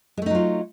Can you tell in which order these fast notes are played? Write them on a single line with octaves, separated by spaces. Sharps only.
G#3 A3 D#4 F#3 F4